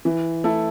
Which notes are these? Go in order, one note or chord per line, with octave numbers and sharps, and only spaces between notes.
E3
A3 E4 A4